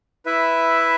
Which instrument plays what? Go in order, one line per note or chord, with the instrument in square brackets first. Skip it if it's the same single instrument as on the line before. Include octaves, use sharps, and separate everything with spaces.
[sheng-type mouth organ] E4 B4 E5